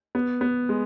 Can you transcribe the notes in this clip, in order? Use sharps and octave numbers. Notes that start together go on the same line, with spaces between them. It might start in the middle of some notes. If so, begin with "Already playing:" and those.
B3
B3
G#3